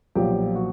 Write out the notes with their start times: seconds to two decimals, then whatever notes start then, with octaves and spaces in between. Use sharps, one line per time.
0.15 B1 A#2 F3 G4
0.55 F#4